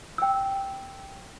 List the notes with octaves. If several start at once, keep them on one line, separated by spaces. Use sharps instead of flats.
G5 E6